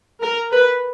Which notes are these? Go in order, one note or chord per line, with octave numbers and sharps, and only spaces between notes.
A#4
B4